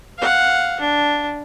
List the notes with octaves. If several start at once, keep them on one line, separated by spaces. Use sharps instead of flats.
F5 F#5
D4